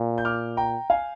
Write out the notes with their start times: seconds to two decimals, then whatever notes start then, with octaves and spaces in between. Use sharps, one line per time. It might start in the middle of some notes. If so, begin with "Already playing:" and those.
Already playing: A#2
0.18 G6
0.25 D6 F6
0.57 G5 A#5
0.90 F5 G#5